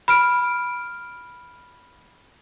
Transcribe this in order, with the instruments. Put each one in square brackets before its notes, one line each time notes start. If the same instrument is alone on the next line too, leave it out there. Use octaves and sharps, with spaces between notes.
[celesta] B5 F6 D7